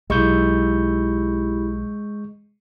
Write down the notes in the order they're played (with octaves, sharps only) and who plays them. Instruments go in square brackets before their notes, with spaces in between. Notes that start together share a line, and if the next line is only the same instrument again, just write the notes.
[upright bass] B1 [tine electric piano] G#3 C#6 G6 [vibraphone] E4 G4 B5